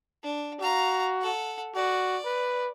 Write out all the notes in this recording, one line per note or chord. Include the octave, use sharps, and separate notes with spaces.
D4
F#4 F5 A#5
A4 F#5
F#4 D5
B4